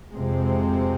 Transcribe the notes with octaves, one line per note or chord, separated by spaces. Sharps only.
F2 C3 G#3 C4